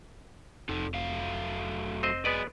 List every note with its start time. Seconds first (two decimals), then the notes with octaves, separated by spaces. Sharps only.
0.69 F1 D#4 A4
0.94 F#3 A3 F5
2.03 C4 C5 D#5
2.25 F#3 B3 G#4 B4 D5 D#5